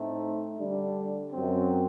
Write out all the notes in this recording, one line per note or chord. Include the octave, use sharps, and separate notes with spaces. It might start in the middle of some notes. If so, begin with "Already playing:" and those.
Already playing: A2 A3 C4 D#4
D3 G3 D4
F#2 F#3 C4